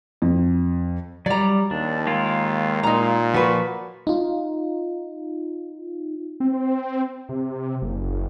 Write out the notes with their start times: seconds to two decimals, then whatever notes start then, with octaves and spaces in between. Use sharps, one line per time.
0.22 F2
1.26 F#3 G3 D5 A#5
1.71 D#2 D4
2.07 G#3 F4 A#4
2.83 A#2 D#4 A#5
3.34 F3 F#4 B4 C#6
4.07 D#4 F4
6.40 C4
7.29 C3
7.82 F#1